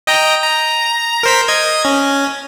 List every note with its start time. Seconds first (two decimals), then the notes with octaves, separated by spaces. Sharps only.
0.07 D#5 G5 A#5
0.43 A#5
1.23 A#4 C5 B6
1.48 D#5 G#6
1.85 C#4